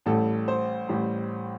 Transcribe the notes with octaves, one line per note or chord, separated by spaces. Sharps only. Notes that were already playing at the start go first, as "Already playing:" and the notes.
A1 A2 G3 A4
C5
A1 A2 G3